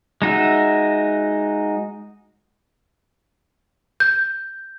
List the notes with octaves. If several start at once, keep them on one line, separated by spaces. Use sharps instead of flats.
G#3 D#4 F#4 E5
G6